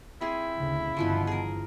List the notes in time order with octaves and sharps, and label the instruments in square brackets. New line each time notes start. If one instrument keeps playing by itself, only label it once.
[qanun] C4 G#4 [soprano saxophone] E4
[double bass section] D2 C#3
[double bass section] G1 [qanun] B2 E3 F3
[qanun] G#4 A#4